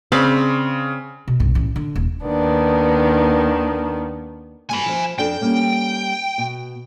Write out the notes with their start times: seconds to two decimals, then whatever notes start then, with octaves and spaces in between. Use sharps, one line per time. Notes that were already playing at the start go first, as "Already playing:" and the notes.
0.12 C#3 C4 D5 B5
1.28 B2
1.40 B1 G2
1.55 A1 E3
1.76 D3
1.95 D#1
2.24 D#2 D#3 B3 D4
4.69 D2 G2 G#5 B5
4.86 F3 C5
5.19 F2 D4 A4 G5
5.41 G3 A#3 C#4
6.38 B2